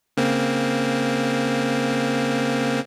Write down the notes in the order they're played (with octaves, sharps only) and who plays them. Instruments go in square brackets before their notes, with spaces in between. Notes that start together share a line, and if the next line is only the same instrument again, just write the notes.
[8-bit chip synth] C#3 A#3 C4